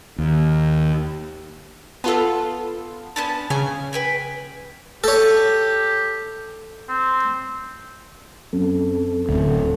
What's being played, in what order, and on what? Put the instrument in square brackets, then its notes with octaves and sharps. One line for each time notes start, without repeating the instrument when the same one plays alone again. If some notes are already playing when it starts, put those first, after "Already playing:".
[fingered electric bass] D#2
[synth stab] B3 F4 A4 [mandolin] A5 E6
[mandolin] B3 C#4 D4 [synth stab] A5
[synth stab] C#3 [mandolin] G#5
[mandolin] B4 G5 G#5
[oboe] G4 [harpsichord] A4 C#5
[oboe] C4
[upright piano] F#2 [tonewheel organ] F#3 C4 A4
[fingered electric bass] D1 D2